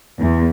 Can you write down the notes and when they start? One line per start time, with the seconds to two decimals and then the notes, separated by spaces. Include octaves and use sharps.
0.20 E2